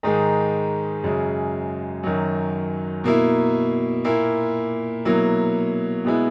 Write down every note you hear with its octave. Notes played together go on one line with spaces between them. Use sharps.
G#2 D#3 G#3
F#2 C#3 G#3
F#2 D#3 F#3
B2 A#3 E4
A#2 A#3 E4
B2 F#3 A#3 E4
B2 G#3 B3 E4